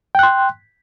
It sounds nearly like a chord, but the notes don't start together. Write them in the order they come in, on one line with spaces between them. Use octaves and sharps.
G5 F#6 C6